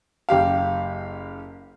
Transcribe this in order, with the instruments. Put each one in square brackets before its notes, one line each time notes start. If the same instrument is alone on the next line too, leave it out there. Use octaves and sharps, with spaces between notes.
[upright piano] F#1 G4 F5